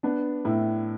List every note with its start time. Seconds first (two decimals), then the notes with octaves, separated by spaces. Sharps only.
0.03 B3 D4
0.45 A2 E4